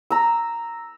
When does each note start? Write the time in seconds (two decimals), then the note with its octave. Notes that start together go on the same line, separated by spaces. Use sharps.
0.11 A#5 E6